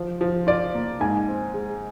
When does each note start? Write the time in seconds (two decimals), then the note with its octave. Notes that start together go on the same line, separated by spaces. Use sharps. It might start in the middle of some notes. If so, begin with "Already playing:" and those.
Already playing: F3
0.21 F3
0.47 F4 D5
0.75 A#3
1.00 G#2 G#5
1.28 C4
1.54 G#3